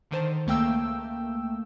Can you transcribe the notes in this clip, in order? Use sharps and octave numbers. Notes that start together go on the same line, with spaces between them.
D3 D#3 C5 A5
C#2 A3 A#3 G5 E6